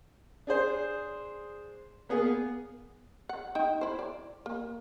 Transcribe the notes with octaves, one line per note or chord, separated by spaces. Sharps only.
D4 G#4 C5
A#3 B3 G#4
F#5
D#4 G5
E4 C5
D5
A#3